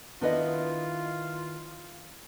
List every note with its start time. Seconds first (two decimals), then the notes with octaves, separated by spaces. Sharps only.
0.22 D#3 B3 D4 E4 F4 B4 D#5